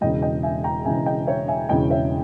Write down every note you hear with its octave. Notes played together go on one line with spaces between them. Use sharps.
E1 E2 C#3 D#5 G5
D#5 G5
E5 G#5
G5 A#5
E1 E2 C#3 E5 G#5
D#5 G5
C#5 E5
E5 G#5
E1 E2 C#3 D#5 G5
C#5 E5